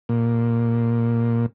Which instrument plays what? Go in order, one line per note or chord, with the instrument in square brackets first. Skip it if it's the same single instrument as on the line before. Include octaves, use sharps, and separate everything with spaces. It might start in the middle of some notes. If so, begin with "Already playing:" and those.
[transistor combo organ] A#2